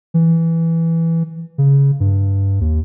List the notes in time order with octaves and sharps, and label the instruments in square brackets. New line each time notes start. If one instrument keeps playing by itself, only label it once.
[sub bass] E3
C#3
G2
D#2